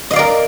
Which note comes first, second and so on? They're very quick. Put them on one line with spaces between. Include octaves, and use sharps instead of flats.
D#5 F5 D5 A#4